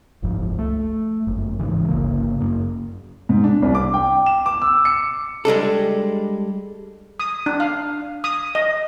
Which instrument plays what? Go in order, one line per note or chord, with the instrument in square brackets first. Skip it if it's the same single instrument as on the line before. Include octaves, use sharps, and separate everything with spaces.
[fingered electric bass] F#1 C#2 G#2 F3
A3
G1 F#2
C#2 G#2 C#3 E3
G1 G2 C#3 A#3
F#2 A#3
[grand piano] G#2
D4
C2
D6
G5
E7
D6
E6
C#7
[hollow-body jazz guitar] G3 G#3 D4 A4
[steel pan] D#6
D4
F5
D#6
D#5